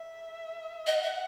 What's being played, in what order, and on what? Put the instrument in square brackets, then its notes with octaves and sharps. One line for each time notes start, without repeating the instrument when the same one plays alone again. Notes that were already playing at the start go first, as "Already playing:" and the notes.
Already playing: [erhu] E5
[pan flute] D#5 [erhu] F#5
[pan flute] E5